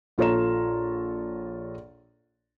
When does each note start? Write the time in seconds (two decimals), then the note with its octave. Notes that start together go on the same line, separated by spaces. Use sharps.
0.18 A#1 F4 A4 C#5 A#5 E7